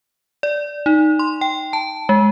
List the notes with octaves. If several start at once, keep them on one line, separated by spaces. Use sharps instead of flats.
D5
D#4
C6
G5
A5
G#3